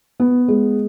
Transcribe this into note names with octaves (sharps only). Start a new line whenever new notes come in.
B3
G#3